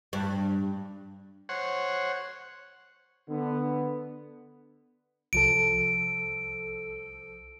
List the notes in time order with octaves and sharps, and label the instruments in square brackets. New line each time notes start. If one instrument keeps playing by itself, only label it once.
[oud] G2
[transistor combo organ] C5 C#5 F#5
[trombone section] D3 B3
[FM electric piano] C2 F3 A4 [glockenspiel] D7